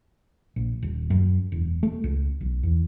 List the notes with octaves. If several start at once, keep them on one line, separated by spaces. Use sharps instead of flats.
A#1
D#1
F#2
E1
A3
C#2
B1
E2